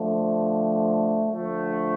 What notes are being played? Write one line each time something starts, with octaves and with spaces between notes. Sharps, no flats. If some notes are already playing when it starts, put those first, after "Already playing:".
Already playing: D3 F3 A3
D3 F3 A3